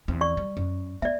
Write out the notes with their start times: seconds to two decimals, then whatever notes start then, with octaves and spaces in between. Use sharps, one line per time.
0.08 E2 C4
0.21 D5 C#6
0.37 G3
0.57 F#2
1.02 B3 D5 E5